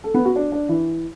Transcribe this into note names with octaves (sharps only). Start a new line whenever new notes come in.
A4
B3
F#4
D4
D4
E3